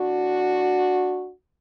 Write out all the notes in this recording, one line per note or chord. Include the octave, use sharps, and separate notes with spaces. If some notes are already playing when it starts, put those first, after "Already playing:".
Already playing: A2 D4 F#4